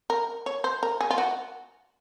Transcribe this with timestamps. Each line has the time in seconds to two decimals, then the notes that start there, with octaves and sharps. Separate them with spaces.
0.10 A#4
0.46 C#5
0.64 C5
0.83 A#4
1.01 G#4
1.11 F4
1.18 F#4